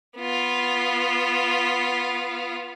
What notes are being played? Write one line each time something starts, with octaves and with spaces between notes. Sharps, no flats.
B3 F4